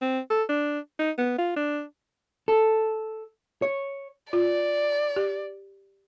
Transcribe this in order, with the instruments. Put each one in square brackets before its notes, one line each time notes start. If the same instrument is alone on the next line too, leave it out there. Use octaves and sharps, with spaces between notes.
[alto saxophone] C4
A4
D4
D#4
B3
F4
D4
[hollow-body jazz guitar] A4
C#5
[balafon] F4 [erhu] D5
[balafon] G4